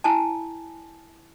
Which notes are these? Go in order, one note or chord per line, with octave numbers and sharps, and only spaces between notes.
E4 G#5 A5